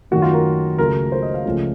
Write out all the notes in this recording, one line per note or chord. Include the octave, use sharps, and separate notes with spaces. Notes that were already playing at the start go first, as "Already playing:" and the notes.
F#2 D#3 A3 F#4
F4
A#4
C#2 C#3 F#3 A3 A#4
C5
D#5
F5
C#2 C#3 F3 A3